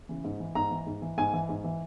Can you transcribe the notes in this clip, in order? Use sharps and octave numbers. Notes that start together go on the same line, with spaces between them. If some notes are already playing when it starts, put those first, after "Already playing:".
C#3 E3
G#2
E3
G#2 A#5
E3
G#2
E3
G#2 G#5
E3
G#2
E3